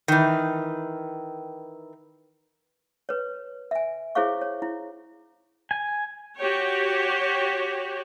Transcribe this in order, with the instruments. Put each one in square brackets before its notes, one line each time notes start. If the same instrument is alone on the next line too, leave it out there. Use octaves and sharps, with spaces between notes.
[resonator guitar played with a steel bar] D#3 E3
[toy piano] B4 C#5
E5 G#5
E4 G#4 C5 C#5 F5 C#6
C#5
E4
[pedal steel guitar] G#5
[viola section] F#4 G4 C#5